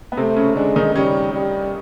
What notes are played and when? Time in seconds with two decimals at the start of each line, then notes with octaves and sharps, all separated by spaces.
0.12 B3
0.17 C3 A3 C4
0.36 C#3 C#4
0.56 D3 G#3 D4
0.76 D#3 D#4
0.95 C#3 G3 C#4
1.34 G3